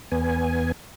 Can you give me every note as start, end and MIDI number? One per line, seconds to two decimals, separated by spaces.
0.12 0.72 40
0.12 0.72 59
0.12 0.72 80